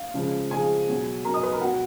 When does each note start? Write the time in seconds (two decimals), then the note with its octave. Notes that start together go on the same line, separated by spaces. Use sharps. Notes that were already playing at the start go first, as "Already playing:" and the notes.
Already playing: F5
0.14 C#3 F3 G#3
0.51 C#3 F3 G#3 G#4 G#5
0.89 B2 F#3
1.25 B2 F#3 A#4 A#5
1.34 D#5 D#6
1.43 B4 B5
1.52 A#4 A#5
1.61 B2 F#3 F#4 F#5